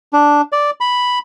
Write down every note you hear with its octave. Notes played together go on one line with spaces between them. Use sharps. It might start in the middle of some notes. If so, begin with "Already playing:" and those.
D4
D5
B5